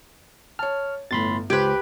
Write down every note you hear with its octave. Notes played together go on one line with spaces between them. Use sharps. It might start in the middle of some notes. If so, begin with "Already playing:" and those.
C#5 A5 F6
G1 A2 B5 C6 A6
C#2 G4 B4 C5 G#6 D7